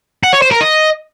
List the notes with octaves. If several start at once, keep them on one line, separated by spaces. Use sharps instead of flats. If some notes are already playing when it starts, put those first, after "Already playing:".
F#5
C#5
C5
A#4
D#5